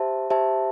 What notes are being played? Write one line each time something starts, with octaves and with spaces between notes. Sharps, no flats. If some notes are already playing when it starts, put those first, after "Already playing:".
Already playing: G4 C5 E5 A5
G4 C5 E5 A5